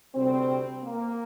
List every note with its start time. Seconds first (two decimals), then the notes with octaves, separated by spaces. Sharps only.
0.14 D2 C3 G3 C4
0.84 A#3